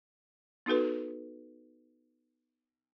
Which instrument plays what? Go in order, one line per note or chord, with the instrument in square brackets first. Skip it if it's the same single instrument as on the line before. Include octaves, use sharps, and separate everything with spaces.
[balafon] B3 D#4 F#4 A4 B4